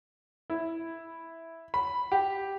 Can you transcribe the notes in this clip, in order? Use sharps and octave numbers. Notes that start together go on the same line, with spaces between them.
E4
B5
G4